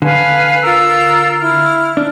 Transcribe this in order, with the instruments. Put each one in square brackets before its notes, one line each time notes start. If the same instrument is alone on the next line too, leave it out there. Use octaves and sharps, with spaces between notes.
[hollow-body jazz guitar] D3 [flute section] B4 F5 G#5
[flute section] F4 A#4 E6
E4 F6
[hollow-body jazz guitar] D4